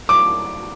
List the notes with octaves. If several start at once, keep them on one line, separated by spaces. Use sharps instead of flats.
D6